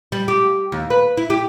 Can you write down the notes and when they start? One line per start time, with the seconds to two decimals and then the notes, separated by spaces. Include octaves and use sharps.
0.12 G3
0.28 G4
0.72 D#2
0.90 B4
1.17 E4
1.30 G4